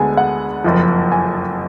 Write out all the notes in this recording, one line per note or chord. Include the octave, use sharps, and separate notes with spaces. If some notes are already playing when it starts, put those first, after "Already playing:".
Already playing: D2 D3 G#3 B3 G#5
F#5
F#1 F2 F3
G#5